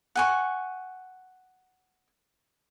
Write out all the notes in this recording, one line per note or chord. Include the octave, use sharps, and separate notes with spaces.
F#5 G#5 C#6